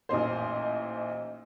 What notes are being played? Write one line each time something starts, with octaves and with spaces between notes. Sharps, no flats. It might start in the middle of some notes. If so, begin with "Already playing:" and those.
A1 A#2 D#4 C5